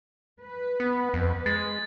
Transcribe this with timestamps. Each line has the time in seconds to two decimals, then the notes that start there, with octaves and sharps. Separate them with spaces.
0.42 B4
0.80 B3
1.14 F2
1.46 G#3 A6